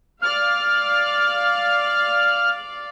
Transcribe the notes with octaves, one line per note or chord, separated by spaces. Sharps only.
D5 F5 F6